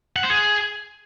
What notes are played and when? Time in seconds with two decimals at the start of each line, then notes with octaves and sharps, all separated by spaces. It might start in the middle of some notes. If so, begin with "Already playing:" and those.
0.16 F#5
0.23 C5
0.30 G#4